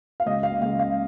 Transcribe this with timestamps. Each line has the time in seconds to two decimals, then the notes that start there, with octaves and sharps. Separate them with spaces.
0.20 F5
0.26 C#2 D#5
0.43 F5
0.62 C#2 F5
0.79 F5